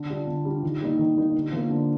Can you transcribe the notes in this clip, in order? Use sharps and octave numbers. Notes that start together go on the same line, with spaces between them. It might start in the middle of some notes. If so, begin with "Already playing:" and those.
Already playing: D3
G3 D4 F4
D3
G3 D4 F4
D#3
G3 A#3 D#4
D#3
G3 A#3 D#4
D3
F3 A#3
D3